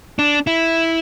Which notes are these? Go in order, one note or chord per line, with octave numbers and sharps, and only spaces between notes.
D4
E4